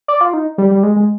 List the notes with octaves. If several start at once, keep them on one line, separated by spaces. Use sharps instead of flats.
D5
F4
D#4
G3
G3
G#3
G#3